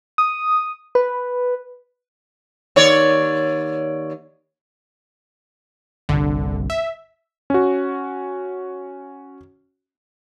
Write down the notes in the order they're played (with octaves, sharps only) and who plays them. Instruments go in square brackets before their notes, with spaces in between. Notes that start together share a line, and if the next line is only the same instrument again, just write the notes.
[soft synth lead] D#6
B4
[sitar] D#2 C#5 D5
[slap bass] G1 C2 [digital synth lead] D3
[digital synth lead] E5
[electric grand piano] C#4 F#4